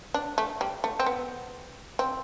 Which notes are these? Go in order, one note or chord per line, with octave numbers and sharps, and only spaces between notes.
D4
A3
G3
A3
C4
B3
C4